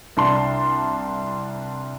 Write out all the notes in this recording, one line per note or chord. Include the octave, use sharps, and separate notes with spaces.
C2 D4 A5 C6